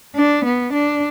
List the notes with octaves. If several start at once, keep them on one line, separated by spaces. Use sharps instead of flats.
D4
B3
D4